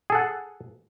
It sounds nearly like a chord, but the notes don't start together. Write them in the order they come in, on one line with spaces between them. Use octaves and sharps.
G#4 A4 F#5